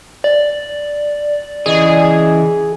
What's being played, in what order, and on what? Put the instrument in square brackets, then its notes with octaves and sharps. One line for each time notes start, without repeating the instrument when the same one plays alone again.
[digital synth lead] D5
[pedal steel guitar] C#3 E3 D#5 [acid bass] G#4